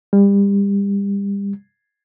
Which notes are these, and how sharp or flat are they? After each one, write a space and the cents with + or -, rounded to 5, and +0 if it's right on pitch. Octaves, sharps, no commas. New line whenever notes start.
G3 +30